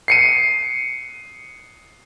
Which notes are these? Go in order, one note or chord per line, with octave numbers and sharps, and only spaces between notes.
C7 C#7 D#7